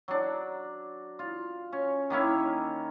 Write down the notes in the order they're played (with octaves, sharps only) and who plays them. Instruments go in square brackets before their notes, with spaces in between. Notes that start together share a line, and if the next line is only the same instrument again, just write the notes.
[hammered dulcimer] F#3 D4
F4
C#4
D#3 A#3 C#4 E4